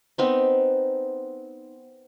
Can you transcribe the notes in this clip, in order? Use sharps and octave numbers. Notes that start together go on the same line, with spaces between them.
B3 C4 D#4